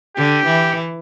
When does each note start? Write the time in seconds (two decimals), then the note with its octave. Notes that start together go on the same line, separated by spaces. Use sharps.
0.16 D3 G4
0.46 E3